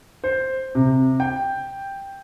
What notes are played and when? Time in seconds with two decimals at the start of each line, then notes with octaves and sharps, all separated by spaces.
0.24 C5
0.75 C3
1.20 G5